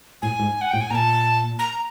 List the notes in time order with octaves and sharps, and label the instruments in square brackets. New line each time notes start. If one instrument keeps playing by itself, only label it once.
[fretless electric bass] A2 [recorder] G#5
[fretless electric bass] G#2
[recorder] F#5
[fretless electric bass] A2 [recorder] G5
[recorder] G#5
[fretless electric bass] A#2 [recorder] A#5
[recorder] A5
A#5